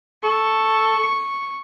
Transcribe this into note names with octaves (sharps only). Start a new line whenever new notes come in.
A4 C#6